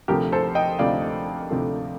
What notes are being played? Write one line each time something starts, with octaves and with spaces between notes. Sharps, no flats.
D2 C3 F3 A3 G4 A#4
A4 C5
D#5 G5
D2 C3 F3 A3 D5 F5
D2 C3 F3 A3